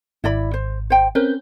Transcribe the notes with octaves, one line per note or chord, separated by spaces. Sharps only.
G#1 E4 D5 B5
C5
C5 G5
C4 C#4 A#4 B4 G6